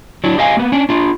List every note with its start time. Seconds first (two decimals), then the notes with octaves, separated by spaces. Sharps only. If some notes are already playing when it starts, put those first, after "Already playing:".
0.24 F#3 D4 E4
0.38 G4 D#5 F5 G#5
0.57 A#3 B3
0.72 C#4 D4
0.89 D4 F4